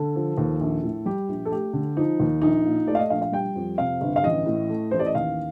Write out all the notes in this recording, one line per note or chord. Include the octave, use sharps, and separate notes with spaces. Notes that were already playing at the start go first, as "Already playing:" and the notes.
Already playing: D3 A4
F3
D#2
A#1
A2
G3 G4
A#1
A4
A3 G4
D3
F3 D#4
D#2
A#1 D#4
A#2
A3 D5
F5
D#5
A#1 F5
F5
G3 G5
F2
C3 F5
G1
F5
A1 D#5
A2
A3
A1 C5
D5
D#5
D#2 F5